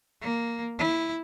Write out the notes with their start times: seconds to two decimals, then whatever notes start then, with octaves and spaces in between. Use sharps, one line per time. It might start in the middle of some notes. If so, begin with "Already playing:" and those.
0.22 A#3
0.79 E4